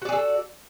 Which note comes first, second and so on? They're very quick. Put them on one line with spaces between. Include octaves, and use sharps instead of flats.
F#4 D5 G#4 A4